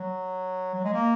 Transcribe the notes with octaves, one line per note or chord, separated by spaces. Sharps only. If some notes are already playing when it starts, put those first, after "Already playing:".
Already playing: F#3
F#3
G#3
A#3